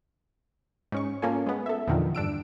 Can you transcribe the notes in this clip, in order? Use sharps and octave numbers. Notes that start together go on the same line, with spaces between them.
G#2 C#4 C#6
A#3 C#4 F4 A4 G#5
G#3 B3
A4 E5
E2 A#2 D3 D#3 F3
G2 D4 E6 D7